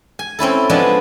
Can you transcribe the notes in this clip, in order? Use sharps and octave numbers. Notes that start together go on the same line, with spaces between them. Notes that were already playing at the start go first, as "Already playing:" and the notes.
G#5
C4 C#4 E4 A4
F3 G#3 B3 D4 G#4